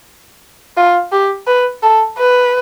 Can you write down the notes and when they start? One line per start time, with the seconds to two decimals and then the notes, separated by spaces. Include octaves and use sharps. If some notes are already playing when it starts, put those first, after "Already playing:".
0.77 F4
1.12 G4
1.47 B4
1.83 A4
2.18 B4